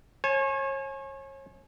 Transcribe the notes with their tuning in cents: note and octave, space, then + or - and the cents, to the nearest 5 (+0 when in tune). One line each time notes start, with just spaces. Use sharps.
C#5 -35 G#5 +30